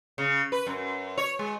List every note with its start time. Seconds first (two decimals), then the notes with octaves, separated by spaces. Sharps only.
0.18 C#3
0.52 B4
0.67 F#2
1.18 C#5
1.39 G#3